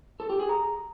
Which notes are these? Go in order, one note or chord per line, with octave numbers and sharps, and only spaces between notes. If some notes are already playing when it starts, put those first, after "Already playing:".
A4
G4
G#4
A#5